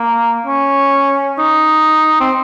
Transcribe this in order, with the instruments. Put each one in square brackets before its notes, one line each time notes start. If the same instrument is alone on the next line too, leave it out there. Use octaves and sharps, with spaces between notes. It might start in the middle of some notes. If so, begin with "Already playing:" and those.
Already playing: [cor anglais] A#3
C#4
D#4
C4